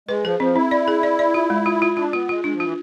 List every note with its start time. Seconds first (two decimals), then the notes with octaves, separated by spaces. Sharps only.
0.09 G#3 B4
0.24 F3 G#4
0.40 F3 C4
0.55 C4 E4
0.71 D5
0.88 G#4
1.03 D5
1.19 D5
1.34 F4
1.50 G#3
1.66 F4
1.82 F4
1.97 D4 F4
2.13 B3 F4
2.29 G#3 F4
2.44 G#3 D4
2.54 F3
2.60 E3 F4